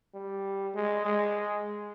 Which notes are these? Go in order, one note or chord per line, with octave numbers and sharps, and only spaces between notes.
G3
G#3
G#3